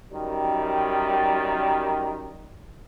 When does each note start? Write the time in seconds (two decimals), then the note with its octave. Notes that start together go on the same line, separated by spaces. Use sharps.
0.12 F#2 D#3 G3